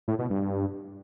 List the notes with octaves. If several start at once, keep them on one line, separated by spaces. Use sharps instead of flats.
A2
B2
G2